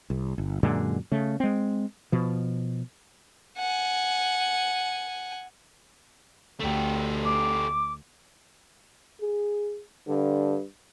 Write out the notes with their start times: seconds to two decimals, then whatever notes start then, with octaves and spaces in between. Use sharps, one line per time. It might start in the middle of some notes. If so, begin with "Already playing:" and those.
0.10 C2
0.38 G1
0.63 F#2 A#2 D3 G#3
1.12 C#3 A3
1.40 G#3 C4
2.12 B2 F3
3.58 F#5 G#5
6.60 D2 A3 G4
7.24 D6
9.21 G#4
10.08 G2 D3